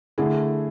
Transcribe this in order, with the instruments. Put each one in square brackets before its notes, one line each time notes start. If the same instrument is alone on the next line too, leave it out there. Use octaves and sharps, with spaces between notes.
[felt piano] D3 A3 E4 G#4